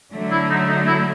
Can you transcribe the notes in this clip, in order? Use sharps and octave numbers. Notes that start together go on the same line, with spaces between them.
D3 F#3 A3
E4
D#4
D#4
E4